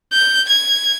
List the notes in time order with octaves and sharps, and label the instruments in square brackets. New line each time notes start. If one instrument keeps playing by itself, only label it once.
[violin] G6
G#6